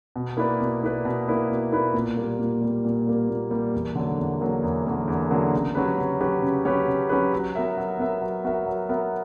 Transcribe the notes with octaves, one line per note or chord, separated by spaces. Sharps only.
B2
A#3 E4 B4 D5
B2
A#3 E4 B4 D5
B2
A#3 E4 B4 D5
B2
A#3 E4 B4 D5
A#2
G3 A#3
A#2
G3 A#3
A#2
G3 A#3
A#2
G3 A#3
E2
D3 F#3 A#3
E2
D3 F#3 A#3
E2
D3 F#3 A#3
E2
D3 F#3 A#3
C#3
F#3 C#4 G4 B4
C#3
F#3 C#4 G4 B4
C#3
F#3 C#4 G4 B4
C#3
F#3 C#4 G4 B4
F#3
B3 F#4 A#4 E5
F#3
B3 F#4 A#4 E5
F#3
B3 F#4 A#4 E5
F#3
B3 F#4 A#4 E5